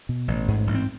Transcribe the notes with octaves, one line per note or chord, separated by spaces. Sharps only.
B2
A1
G#2
A1
C4